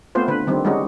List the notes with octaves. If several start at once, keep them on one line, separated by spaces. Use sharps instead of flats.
A3 B3 C4 F4 C5
D3 B4
D3 D#3 G3 C4
G3 G#3 C#4 D#4 F#4